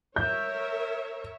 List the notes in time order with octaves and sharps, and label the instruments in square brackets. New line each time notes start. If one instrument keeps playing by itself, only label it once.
[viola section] A#4 C#5 E5 [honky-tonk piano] G6